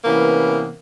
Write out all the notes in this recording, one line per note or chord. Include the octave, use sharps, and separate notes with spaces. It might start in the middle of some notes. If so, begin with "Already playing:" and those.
C3 E3 A#3 B3 C#4